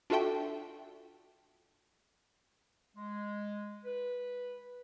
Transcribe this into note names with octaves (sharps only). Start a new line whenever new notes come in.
D4 F4 F#4 A4 E5 G5
G#3
B4